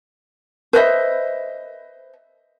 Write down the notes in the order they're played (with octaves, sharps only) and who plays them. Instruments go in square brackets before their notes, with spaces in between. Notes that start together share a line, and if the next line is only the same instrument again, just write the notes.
[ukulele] B4 C5 D#5 E5